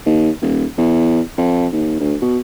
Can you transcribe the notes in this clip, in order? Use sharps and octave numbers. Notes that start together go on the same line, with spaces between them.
D#2
D#1
E2
F2
D#2
D2
B2